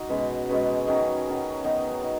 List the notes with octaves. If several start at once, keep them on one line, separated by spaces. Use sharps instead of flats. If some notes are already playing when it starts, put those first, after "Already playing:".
Already playing: D#4 F#4
B2 G#3 C#4 B4
B2 G#3 C#4 B4
D#3 F#3 C#4 G#4
D#3 F#3 C#4 G#4
D#3 B3 D#4
D#3